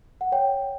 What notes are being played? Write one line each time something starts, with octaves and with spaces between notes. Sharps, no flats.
F#5
C#5 G5